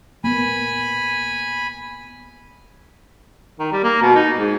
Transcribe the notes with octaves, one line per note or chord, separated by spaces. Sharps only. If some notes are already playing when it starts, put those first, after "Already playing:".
A#3 B3 G#5 B5
D#3
G3
A#3
B2
D#4
G#2